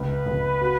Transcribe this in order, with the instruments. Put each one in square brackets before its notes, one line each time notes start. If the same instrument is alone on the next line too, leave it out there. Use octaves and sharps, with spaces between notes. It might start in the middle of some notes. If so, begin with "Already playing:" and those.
Already playing: [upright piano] C#2 [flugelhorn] B4
[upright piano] C#2
F#4